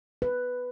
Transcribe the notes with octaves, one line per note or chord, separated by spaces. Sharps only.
B4